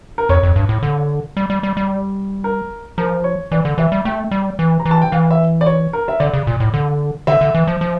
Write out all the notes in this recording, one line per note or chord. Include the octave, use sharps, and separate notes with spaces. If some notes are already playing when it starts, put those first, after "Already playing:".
A#4
F2 C#5
F2
G2
A2
D3
G3
G3
G3
G3
A#4
F3 A#4
C#5
E3 D5
D3
E3 E5
G3
A3 G5
G3
E3
A#5
E3
A5
G5
E3 F5
E5
D5
C#5
A#4
E5
D3 D5
C#3
A#2
A2
D3
D3 E5
D3
E3
F3
F3